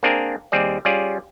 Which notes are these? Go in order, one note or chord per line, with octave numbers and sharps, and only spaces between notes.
A#3 C4 D4 G#4 A#4
D#2 G3 C4 G#4 D5
G3 C#4 F4 G#4 D5